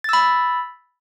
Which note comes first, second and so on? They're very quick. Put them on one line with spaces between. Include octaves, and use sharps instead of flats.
A6 E6 B5